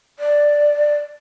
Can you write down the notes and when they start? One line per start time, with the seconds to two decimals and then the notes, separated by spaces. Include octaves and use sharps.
0.19 D5